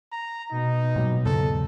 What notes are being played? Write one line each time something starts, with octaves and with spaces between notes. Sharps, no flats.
A#5
B2 D#4
A#2 F#3 G3
E2 G#2 C#3 F#3 B3 A4